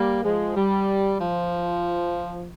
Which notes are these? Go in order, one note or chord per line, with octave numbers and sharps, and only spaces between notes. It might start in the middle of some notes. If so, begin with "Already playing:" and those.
Already playing: G3 A#3
F3 G#3
G3
F3